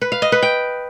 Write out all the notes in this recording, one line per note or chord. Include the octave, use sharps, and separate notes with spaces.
B4
F5
D#5
B4
G5